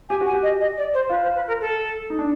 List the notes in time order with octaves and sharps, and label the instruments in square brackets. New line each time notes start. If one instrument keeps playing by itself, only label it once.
[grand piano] G4 [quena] G#5
[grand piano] F#4 [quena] G#5
[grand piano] G4
[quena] D#5
D#5
D5
C5
[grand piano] F4 [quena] B4
[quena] C5
B4
A#4
A4
[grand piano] D#4
D4